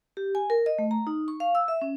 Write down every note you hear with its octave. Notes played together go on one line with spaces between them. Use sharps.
G4
G#5
A#4
D#5
A3
A#5
D#4
C#6
F5
E6
E5
C#4